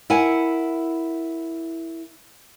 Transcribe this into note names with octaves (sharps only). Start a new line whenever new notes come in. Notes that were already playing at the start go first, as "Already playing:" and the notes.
E4 A#4 F#5 G#5